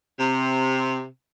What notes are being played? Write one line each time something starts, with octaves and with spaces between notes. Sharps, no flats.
C3